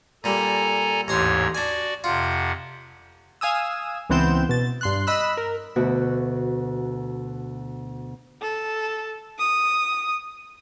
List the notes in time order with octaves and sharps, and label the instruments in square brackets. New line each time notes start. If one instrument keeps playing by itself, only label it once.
[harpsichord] A#2 G3 [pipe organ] A4 G#5 A#5
[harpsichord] A1 A#5 C6 [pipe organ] D#2 G#2 C#5
[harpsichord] D4 G#5 [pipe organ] F#4 D5
[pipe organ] F2 C3 F#5 [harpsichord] F4
[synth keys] F5 G#5 D#6 E6
C#2 E3 B3 C4 G6 E7
B2 A6
G2 C6 F#6
D#5 B5 E6 F#6
A#4
[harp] D2 B2 F#4
[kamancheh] A4
D#6